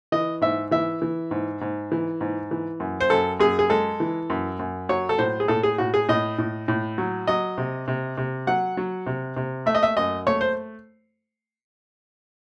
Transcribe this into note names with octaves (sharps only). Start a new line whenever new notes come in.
E3 D#5
G#2 E5
E3 E5
E3
G#2
G#2
E3
G#2
E3
F#2
C5
F#2 A4
F#2 G#4
G#4
G#3 A4
E3
F#2
F#2
F#3 C#5
A4
A2 C5
G#4
A2 A4
G#4
A2 F#4
G#4
A2 D#5
A2
A2
F#3
F#3 D#5
C3
C3
C3
F#3 F#5
F#3
C3
C3
A3 E5
D#5
E5
F#2 D#5
A3 C#5
C5